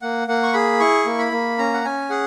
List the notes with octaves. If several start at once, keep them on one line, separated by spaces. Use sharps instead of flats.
A#3 F#5
A#3 F#5
C#6
G#4 B5
E4 C#6
A#3
B5
A#3
C#4 A#5
F#5
C#4 G#5
G#4 F#5